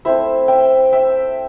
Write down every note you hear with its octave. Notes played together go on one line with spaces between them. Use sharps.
A3 C4 E4 C5 E5
E5 G5
E5 G5